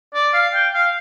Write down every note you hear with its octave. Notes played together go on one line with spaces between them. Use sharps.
D5
F5
G5
F5